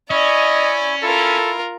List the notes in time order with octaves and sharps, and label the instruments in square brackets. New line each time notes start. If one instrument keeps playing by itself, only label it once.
[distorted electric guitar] C#4 [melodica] E4 G#5 C#6 [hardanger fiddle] D5 [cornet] D#5
[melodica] E4 [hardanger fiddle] F4 A#4 [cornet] A4